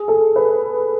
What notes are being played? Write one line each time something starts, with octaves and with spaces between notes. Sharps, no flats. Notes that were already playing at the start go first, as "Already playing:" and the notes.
Already playing: G#4
A4
B4